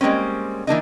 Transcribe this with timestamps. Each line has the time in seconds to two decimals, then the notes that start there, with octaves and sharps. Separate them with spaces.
0.01 G3 G#3 A#3 C4 C#4
0.67 E3 A#3 D4 D#4